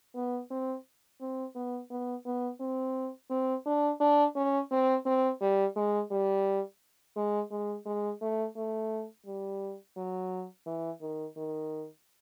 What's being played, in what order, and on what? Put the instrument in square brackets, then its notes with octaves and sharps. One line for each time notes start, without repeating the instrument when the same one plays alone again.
[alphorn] B3
C4
C4
B3
B3
B3
C4
C4
D4
D4
C#4
C4
C4
G3
G#3
G3
G#3
G#3
G#3
A3
A3
G3
F#3
E3
D#3
D#3